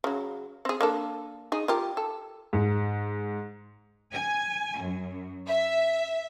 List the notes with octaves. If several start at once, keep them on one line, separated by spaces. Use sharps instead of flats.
C#3 F#3
C4 G#4
A#3 D4 A4
D#4 G#4
F4 G4 A#4
A4
G#2
G#5
F#2
E5